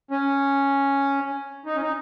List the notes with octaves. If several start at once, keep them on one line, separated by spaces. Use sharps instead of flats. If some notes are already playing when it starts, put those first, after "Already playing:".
C#4
D#4
C#4
D#4